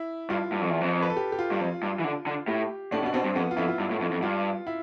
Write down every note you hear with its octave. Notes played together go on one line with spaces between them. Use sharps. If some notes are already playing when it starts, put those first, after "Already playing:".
Already playing: E4
G2 F4
G2
F2
E2
F2
B4
A4
G4
G4
F4
G2
F2
G2
E3
D3
D3
A2 G4
A2 D4
B2
D4
B2 C4
G2
F2 B3
F4
F2 E4
F4
G2
A2
F2
F2
G2 F4
E4